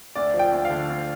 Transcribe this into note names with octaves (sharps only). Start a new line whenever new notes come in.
D2 D5
F3
G5
D2
F5
D3
D2